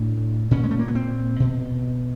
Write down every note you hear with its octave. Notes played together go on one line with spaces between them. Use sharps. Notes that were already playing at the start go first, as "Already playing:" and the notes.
Already playing: A2 D4
A#2 C#4
G#3
A3
A#3
B3
C4
B2